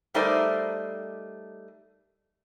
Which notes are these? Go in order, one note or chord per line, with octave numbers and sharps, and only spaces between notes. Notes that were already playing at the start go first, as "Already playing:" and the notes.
G3 A3 D#4 A#4 C5 D5